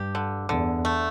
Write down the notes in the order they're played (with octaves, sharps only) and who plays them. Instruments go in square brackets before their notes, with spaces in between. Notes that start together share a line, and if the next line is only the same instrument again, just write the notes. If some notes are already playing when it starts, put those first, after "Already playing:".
Already playing: [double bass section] G2 [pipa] G4
[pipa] D3
[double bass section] E2 [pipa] D3
[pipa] A3